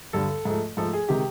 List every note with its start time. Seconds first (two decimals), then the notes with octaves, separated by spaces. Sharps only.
0.13 G2 D3 G3 A4
0.45 G#2 F3 A3
0.77 G#2 F3 A3 A4
0.93 G#4
1.08 C3 D#3 G#3 G4